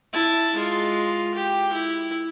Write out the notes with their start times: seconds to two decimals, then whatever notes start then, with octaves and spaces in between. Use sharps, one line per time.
0.13 E4 A5
0.55 G#3 F4
1.35 G4
1.73 E4